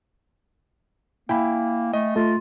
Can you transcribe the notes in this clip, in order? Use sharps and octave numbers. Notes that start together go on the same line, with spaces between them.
A#3 E4 G5 G#5 B5
A3 D#5
A3 F4